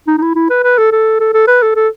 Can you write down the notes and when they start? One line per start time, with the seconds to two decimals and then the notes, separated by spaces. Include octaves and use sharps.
0.07 D#4
0.18 D#4
0.22 E4
0.35 E4
0.50 B4
0.63 B4
0.78 A4
0.92 A4
1.20 A4
1.34 A4
1.47 B4
1.62 A4
1.76 A4